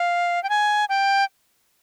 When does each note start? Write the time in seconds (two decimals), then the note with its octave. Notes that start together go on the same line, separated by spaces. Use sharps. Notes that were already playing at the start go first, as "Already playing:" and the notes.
Already playing: F5
0.44 G5
0.49 G#5
0.89 G5